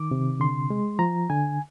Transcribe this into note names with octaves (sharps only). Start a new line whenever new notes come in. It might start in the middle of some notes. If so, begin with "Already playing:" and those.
Already playing: D#3 D6
C3
D3 C6
G#3
F3 A#5
D3 G#5